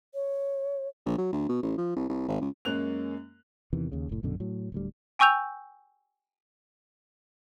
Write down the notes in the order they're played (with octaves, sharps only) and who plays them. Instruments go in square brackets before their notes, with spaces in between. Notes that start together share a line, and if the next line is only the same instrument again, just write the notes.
[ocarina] C#5
[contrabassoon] A#1
F#3
D2
B2
A1
F3
C2
C2
G#1
C#2
[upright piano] F#2 G#3 A#3 C#4 F#6 F7
[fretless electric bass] E2 C3 D#3 E3
D#2 C#3
F1 A2
A#1 F#2 B2 D3
A2 F#3
D1 D2 G3
[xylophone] G5 G#5 C#6 E6 G6 F7